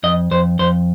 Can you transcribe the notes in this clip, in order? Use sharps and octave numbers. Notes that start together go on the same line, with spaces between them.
F2 D#5
F2 C5
F2 C5